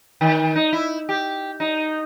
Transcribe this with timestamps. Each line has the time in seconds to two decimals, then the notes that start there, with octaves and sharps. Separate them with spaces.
0.21 D#3
0.56 D#4
0.73 E4
1.09 G4
1.60 D#4